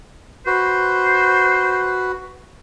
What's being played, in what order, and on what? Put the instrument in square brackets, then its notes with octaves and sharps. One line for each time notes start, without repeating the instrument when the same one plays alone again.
[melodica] F#4 B4 [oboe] C5